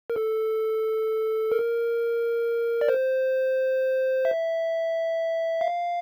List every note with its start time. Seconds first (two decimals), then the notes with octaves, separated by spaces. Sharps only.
0.10 A#4
0.16 A4
1.52 A#4
2.81 D5
2.88 C5
4.25 E5
5.61 F5